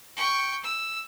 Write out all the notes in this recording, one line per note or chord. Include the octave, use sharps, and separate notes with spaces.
G5 C#6
E6